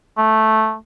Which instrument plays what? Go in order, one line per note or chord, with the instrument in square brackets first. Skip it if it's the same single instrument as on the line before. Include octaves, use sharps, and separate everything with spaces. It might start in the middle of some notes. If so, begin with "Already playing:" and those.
[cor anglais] A3